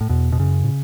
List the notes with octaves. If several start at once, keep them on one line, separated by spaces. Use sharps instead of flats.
A2
E2 B2
B2
F#2 C#3
A2